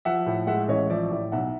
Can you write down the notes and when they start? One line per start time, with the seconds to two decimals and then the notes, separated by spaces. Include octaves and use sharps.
0.05 F3 E5 F#5
0.26 A2
0.47 G#3 E5 F#5
0.68 A1 C#5 D#5
0.89 F3 D5 E5
1.11 A2
1.32 B1 E5 F#5